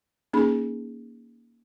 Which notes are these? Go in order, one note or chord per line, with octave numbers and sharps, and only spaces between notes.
A#3 C#4 D#4 G#4 B5